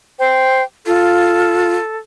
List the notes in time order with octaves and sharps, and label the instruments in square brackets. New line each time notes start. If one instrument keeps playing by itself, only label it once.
[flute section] C5 G5
[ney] F4 [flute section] A4